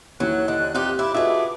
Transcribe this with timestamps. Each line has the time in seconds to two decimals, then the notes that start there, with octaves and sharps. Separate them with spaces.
0.20 D#2 E3 F#3 F#6
0.48 D3 D#5
0.75 C4 D#4 F4 G4
0.99 E4 D6
1.14 A3 F4 F#4 G#4 B4 D#5 E5 F#5